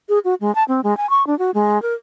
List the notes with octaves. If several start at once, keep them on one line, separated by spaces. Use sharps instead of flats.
G#4
F#4
G#3
A5
C4
G#3
G#5
C#6
D4
F#4
G#3
A#4